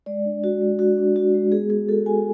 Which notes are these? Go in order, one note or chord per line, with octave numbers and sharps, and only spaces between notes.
G#3 D5
D4
G#3 F#4
G#3
D4 F#4
D4
F#4
G#3
B3 G#4
F#4 G#4
F#4 A4
F#4 G#5